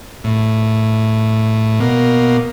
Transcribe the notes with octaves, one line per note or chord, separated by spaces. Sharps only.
A2
B2 A#3